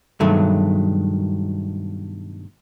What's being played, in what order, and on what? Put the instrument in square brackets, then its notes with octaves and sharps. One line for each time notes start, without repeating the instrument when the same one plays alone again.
[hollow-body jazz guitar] G2 B2 D#3 F#3 G#3 A3